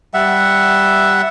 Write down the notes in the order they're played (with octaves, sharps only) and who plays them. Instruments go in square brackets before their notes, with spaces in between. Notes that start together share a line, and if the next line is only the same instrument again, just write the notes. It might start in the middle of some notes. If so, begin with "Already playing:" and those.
[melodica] G3 E5 F#5